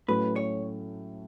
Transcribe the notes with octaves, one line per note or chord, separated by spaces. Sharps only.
A2 F#3 A3 C#4 B4
C#5